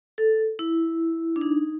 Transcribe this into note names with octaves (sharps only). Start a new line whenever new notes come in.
A4
E4
D4
D#4